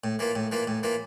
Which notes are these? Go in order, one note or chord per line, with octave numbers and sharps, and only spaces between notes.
A2
E3 A#3 F4
A2
E3 A#3 F4
A2
E3 A#3 F4